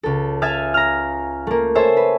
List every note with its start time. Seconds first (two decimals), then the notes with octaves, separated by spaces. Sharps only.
0.03 C#2 A4
0.42 E5 F5 G#5 D#6 F6 A6
0.74 A#5 F6
1.47 A3 A#3
1.75 A4 C5 C#5 E5 G#5
1.97 B4